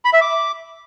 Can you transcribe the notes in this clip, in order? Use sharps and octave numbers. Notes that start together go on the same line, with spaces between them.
B5
E5
D6